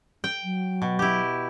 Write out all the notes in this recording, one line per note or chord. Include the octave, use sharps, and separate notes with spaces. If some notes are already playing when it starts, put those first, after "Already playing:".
G5
F#3
B2
E4 G4